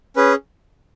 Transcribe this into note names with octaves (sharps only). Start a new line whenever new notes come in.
C#4 G#4 B4